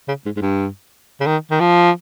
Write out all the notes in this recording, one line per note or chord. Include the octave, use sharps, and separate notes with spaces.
C#3
G#2
G#2
G2
C#3
D#3
D#3
F3